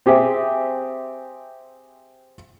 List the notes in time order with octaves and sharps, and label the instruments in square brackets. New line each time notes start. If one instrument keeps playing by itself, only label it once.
[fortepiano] C4 G4 G#4 E5